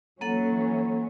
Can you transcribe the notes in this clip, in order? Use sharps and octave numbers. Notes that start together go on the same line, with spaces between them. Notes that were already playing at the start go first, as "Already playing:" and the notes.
E3 F#3 A#3 C#4 A4 F#5